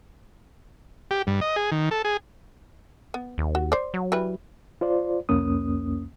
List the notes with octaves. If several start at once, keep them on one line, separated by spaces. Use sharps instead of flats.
G4
G2
D#5
G#4
D#3
A4
G#4
B3
D#2
F#4
C5 D5
F#3
E3 G3 B4
F4 C5 D5
C2 F2 A#3 C#4 D#6